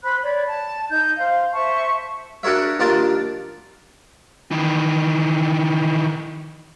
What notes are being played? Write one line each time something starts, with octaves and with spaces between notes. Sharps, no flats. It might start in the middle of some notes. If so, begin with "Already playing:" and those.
C5 B5 F#6
C#5 D5 B5
A5
D#4 G6
C5 F5
C5 E5 A5 C#6
D4 F#4 A#4 C#5 E5
D#2 D4 F4 A#4 A5
D#3 E3